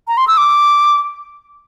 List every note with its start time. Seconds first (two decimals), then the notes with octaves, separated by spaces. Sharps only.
0.08 A#5
0.17 C6
0.28 E6
0.37 D6